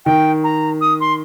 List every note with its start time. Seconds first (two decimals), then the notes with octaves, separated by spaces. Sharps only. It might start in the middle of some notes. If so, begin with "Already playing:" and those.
0.06 D#3 G5
0.44 A#5
0.81 D#6
1.00 C6